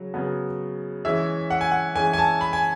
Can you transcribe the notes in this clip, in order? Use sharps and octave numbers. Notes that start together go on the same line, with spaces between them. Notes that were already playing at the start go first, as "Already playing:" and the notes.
Already playing: C#3 F#3
C#3 F#3 B3
E3 G#3 C#4 E5
F#5
G#5
F#5
E3 G#3 C#4 G#5
G#5
A5
B5
G#5